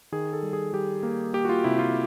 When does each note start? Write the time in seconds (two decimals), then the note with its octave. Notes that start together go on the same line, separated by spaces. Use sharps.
0.12 D#3 G#4
0.33 A4
0.43 G3
0.53 G#4
0.73 G3 G4
1.03 A#3
1.33 A#3 G4
1.45 F#4
1.49 F4
1.64 C3 E4
1.79 F4